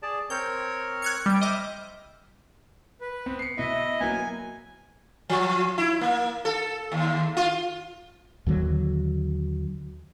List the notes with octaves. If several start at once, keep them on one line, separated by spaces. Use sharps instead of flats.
G#4 D5 A5
C4 A#4 C#5 G6
F#6 G#6 C#7
G3 D7
C5 D#5 E5 D6 F6
B4
B3 C4
C7 C#7
B2 E4 D#5 E5
F#3 A#3 B3 G#5
F3
E4
A#3
A4
D#2
F4
D#2 D3 F#3